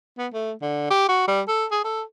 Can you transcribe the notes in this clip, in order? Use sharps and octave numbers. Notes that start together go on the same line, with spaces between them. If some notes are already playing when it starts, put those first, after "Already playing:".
B3
A3
D3
G4
F#4
G3
A4
G#4
A4